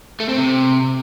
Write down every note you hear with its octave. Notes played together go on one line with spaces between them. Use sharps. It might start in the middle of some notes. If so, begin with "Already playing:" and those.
A3
C4
C3